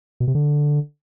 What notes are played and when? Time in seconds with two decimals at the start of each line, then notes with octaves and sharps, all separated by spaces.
0.20 B2
0.28 C3
0.35 D3